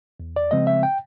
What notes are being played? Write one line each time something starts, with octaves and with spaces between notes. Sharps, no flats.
E2
D5
C#3 F3 G#3 C4 D#5
E5
G5